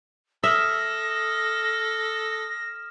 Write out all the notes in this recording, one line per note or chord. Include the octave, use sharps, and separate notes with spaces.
A4 E5 D#6 F6 A#6 E7